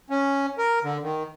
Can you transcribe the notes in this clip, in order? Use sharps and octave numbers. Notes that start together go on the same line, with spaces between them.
C#4
A#4
D3
D#3